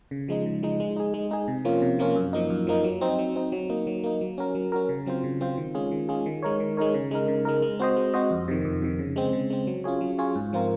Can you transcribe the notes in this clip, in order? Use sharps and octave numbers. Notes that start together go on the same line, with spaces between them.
C#3
F3 G#3 D#4
C#3
F3 G#3 D#4
G#3
D#4 G#4
G#3
D#4 G#4
C3
F3 A#3 C#4 F4
C3
F3 A#3 C#4 F4
F#2
F3 A#3 D#4
F#2
F3 A#3 D#4
F#3
C4 D#4
F#3
C4 D#4
F#3
A#3 D#4
F#3
A#3 D#4
F#3
C#4 F#4 A#4
F#3
C#4 F#4 A#4
C#3
F#3 C4 F4 C5
C#3
F#3 C4 F4 C5
D#3
G#3 C#4 F4 G#4
D#3
G#3 C#4 F4 G#4
D#3
G#3 D#4 A#4 C#5
D#3
G#3 D#4 A#4 C#5
C#3
G#3 D#4 A#4
C#3
G#3 D#4 A#4
G#3
C4 F#4 C5 D#5
G#3
C4 F#4 C5 D#5
F2
C3 D#3
F2
C3 D#3
C#3
G#3 C4
C#3
G#3 C4
F#3
C#4 F4 G#4 C#5
F#3
C#4 F4 G#4 C#5
G#2
F3 C4 F4 A#4